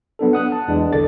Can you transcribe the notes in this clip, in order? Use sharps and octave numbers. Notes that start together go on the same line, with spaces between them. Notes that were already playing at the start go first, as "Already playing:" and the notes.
F#3 B3 D4 A4
F#5 D#6 F#6
A5
E2 E3 G#3 D4
B1 D3 A4 D5 A6